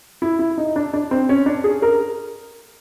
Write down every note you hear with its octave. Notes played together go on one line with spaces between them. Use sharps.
E4
E4
D#4
D4
D4
C4
C#4
D4
G#4
A#4